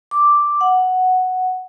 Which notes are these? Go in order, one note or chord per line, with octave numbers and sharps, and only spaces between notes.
D6
F#5